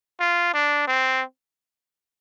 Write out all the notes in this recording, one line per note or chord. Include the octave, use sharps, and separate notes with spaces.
F4
D4
C4